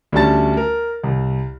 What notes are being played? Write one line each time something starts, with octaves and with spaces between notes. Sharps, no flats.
D2 G3 A3 C#4 A5 A6
A#4
C2